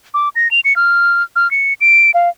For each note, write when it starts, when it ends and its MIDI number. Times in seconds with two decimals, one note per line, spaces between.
0.14 0.29 86
0.35 0.50 94
0.51 0.60 101
0.65 0.76 97
0.76 1.23 89
1.36 1.50 89
1.51 1.73 97
1.81 2.11 98
2.14 2.29 77